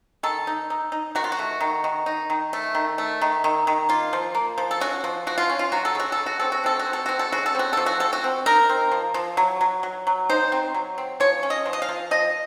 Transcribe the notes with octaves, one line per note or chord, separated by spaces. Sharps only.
D#3 A4
D#4
D#4
D#4
D#3 F#4
F4
F#4
A3
D#3
D#3
D#4
D#3
A3
D#3
A3
D#3
D#3
D#3
A#3 F4
F3
A#3
F3
A4
C#4 F#4
F3
F3 F#4
F4
C#4
F4
F#3 F#4
A4
C#3 F#4
C#3 A4
F#4
C4 A4
F#4
C4 A4
F#4
C4
A4
C4 F#4
A4
C#3 F#4
A4
C4 F#4
F3 A4
F#4
C4 A4
F#4
C4
D#4 A#4
C4
F3
F3
F#3
F#3
F#3
F#3
D#4 C5
C4
F#3
C4
F3 C#5
C#4
D#5
F3
D#5
F5
F3
F3 D#5